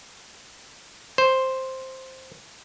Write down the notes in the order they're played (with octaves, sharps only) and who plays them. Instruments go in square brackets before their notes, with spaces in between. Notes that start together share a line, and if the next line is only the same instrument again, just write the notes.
[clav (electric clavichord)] C5